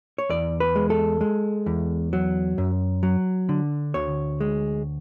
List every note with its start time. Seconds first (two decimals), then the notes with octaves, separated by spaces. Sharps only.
0.18 C#5
0.29 E2 D5
0.60 B4
0.76 G#3
0.90 A4
1.21 G#3
1.66 E2
2.13 F#3
2.58 F#2
3.03 F#3
3.49 D3
3.94 D2 C#5
4.41 G#3